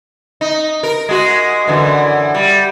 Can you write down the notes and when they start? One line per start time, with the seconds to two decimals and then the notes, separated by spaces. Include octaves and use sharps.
0.41 D#4
0.83 A#4
1.09 G#3 F#4
1.68 F#2 D3 E3
2.34 G3